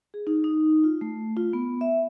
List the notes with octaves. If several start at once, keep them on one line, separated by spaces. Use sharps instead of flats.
G#4
D#4
D#4
F4
A3
F4
B3
E5